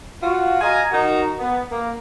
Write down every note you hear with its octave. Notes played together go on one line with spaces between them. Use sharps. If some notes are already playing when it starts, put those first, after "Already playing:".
F4 F#4
D#5 F5 G#5 A#5
D#3 D#4 F#4 A#5
B3
A#3